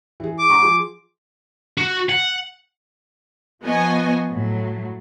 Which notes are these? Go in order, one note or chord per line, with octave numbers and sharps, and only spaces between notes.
E3 G#4
D6
F#5 A#5 C#6
F3 G#4 C6
F#4
F#5
F3 B3 D#5 G#5 C#6
A2 F#3